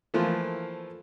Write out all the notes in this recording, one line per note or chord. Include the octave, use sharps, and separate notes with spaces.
E3 F3 A3 A#3 F4